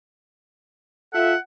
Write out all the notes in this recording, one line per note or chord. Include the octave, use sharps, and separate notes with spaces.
F4 A4 E5 F#5